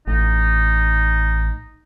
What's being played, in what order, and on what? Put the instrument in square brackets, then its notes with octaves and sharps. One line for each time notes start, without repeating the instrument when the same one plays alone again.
[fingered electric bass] A1 [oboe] D#4